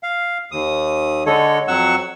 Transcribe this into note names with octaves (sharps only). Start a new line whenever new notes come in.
F5
D#2 D#6
D3 G#3 A4 C#5
F2 F#3 F#5 C#6 E6